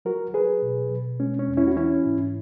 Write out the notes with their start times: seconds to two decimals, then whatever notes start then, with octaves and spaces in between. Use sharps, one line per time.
0.05 F#3 F#4 A#4
0.34 F#3 G#4 B4
0.62 B2
0.91 B2
1.20 G#3 C#4
1.39 C#4
1.48 E2
1.57 C#4 E4
1.67 F#4
1.77 E3 C#4 E4
2.06 G#2